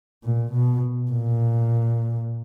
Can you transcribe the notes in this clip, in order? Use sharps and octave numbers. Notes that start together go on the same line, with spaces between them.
A#2
B2
A#2